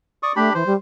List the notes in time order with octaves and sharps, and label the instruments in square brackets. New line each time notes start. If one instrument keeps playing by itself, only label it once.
[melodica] D5 C#6 D#6
[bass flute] A3 [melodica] D4 G4 B5
[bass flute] E3 [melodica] C5
[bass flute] G3